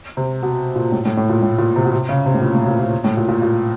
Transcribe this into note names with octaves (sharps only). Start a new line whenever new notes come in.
C3
B2
A#2
A2
A2
A2
A#2
A2
A#2
C3
B2
C3
C#3
C3
A2
A#2
A2
A#2
A#2
A2
A#2
A#2
A#2